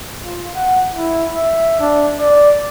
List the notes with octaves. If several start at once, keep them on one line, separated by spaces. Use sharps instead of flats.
F4
F#5
E4
E5
D4
D5